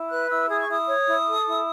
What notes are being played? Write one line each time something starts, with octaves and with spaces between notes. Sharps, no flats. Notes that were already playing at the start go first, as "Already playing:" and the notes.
Already playing: E4
B4 F#6
E4 E6
G#4 D#6
C#6
E4 D#6
C#5
E4
A4
E4